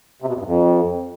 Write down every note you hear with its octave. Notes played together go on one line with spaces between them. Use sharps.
C3
B2
E2
G2
F2